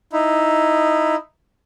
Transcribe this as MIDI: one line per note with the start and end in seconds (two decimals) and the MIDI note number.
0.13 1.15 63
0.13 1.15 64